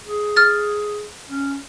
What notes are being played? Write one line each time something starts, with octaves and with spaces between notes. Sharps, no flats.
G#4
F6 A6
C#4